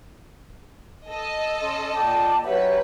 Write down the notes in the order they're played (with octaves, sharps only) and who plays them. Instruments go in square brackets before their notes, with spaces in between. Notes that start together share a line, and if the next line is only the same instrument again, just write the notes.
[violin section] A4 D#5
[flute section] C#4 C6
[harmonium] A#2 [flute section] G5 A5 D6
[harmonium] F#3 C#4 [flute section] G4 E5 F#5 [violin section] B4